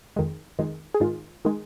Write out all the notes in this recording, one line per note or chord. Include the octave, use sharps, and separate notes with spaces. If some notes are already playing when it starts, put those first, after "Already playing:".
F2 D#3 G#3
F2 D#3 G#3
G#4
G#2 D#3 G#3 F4
D#3 G#3